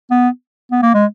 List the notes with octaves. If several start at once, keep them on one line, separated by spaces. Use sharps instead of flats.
B3
B3
A#3
G#3